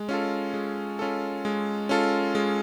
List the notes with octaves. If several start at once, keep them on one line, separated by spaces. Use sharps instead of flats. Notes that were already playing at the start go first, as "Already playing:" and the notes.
Already playing: G#3
C#4 F4 A4
G#3
C#4 F4 A4
G#3
C#4 F4 A4
G#3